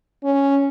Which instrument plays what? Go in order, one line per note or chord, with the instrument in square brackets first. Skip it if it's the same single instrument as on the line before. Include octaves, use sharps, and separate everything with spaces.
[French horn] C#4